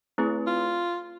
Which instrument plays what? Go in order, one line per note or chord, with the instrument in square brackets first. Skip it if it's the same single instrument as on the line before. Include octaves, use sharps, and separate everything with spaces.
[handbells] A3 C4 E4 G#4 B4
[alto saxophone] F4